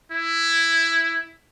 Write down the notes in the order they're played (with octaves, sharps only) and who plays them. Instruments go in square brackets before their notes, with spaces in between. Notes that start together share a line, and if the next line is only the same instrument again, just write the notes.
[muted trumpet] E4